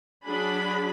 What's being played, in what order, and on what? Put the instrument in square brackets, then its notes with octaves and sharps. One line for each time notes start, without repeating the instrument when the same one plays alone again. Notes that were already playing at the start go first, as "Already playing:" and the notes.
[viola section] F#3 D4 G#4 B5